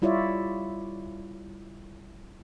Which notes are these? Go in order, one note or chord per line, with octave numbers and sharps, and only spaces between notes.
G3 E4 F4 C#5 D5 E5